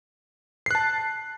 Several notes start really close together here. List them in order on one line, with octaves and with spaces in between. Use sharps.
C7 F#6 A5